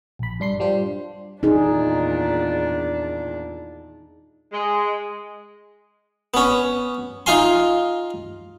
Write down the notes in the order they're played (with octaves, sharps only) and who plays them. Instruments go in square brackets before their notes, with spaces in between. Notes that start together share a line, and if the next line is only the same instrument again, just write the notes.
[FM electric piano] A#1 B5
G2 D4 C6 C7
G3 D4 F4 C5
[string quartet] E2 A#2 D4 [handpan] D#4 G#4
[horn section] G#3
[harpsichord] B3 C#4
D#4 F4 F5 G#5 C6